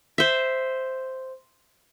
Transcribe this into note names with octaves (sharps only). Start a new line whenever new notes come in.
C5 E5